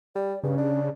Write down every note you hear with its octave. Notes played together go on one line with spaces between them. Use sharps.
G3 D5
G2 C#3 C#4
D4